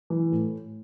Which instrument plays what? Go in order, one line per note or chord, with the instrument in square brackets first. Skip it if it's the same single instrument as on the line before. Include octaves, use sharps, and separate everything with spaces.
[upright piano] E3
A2